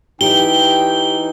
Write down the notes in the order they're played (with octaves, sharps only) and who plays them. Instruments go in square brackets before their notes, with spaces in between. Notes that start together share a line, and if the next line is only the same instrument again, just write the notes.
[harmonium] E3 D#4 [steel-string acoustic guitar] G4 C#5 [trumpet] G5 [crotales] G7